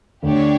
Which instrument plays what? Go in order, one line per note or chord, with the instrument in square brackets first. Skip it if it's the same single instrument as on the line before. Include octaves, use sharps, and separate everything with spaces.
[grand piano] D2 D3 [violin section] D4 G4 C#5